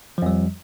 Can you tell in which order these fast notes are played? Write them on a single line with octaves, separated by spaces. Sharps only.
F3 F2 G3